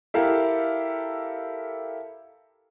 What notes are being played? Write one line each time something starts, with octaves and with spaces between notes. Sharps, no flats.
E4 G4 A4 A#4 F5